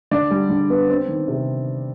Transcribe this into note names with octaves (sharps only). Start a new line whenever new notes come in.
D3 D5
G3
D3
B3
C4
D#3
C3